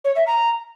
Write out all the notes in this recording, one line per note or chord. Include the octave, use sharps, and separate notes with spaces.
C#5
E5
A#5